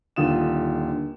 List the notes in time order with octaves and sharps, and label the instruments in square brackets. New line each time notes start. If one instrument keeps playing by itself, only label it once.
[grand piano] D#1 D3 F4 D#6 E7